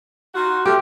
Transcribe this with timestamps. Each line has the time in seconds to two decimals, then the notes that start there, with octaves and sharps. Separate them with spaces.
0.34 D#4 F4 F#4
0.65 F3 A3 G4